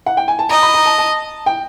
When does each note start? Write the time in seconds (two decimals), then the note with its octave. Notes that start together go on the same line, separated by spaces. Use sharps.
0.06 F#5
0.17 G5
0.28 G#5
0.39 A5
0.49 D#5 A#5
0.63 B5
0.74 A#5
0.86 A5
0.98 A5
1.46 G5